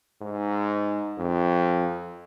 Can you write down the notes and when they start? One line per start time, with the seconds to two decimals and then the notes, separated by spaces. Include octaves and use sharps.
0.21 G#2
1.17 F2